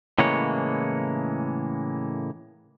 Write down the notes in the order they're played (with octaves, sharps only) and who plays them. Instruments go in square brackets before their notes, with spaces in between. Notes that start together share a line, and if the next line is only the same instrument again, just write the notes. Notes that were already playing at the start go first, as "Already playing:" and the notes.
[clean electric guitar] A2 C#3 E3 G#3 A#3 C#5